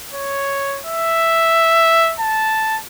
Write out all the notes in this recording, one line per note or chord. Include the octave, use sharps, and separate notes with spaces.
C#5
E5
A5